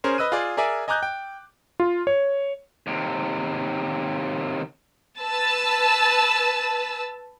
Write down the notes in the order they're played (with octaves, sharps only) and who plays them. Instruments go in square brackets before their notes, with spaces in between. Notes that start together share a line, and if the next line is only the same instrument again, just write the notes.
[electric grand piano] C#4 G#4 A#4 C5
B4 D#5 E6 F#6 D#7
F4 G#4 D5
G#4 A#4 D5 E5 G#5
D#5 G#5 A#5 D6 F#6 G6
G5
F4
C#5
[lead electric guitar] D#2 C3
[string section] B4 A5 E6